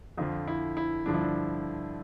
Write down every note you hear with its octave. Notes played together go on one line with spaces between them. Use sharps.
F2 D3 F3 F4
E4
E4
G2 D3 F3 D4
E4
D4